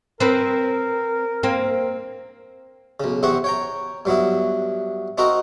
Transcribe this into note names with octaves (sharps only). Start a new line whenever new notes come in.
C4 A#4 B4
A#3 C4
B1 C#3
E2 C3 C4 C5 F#5 C#6
C#5 G5 A#5
G2 F#3 B3 E4
C4 D#4 F#4 A#4 A#5